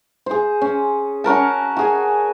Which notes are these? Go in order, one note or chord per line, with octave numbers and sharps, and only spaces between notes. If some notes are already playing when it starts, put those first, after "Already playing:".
G#4 C5
C#4
C#4 F#4 A#4 A5
F#4 G#4 G#5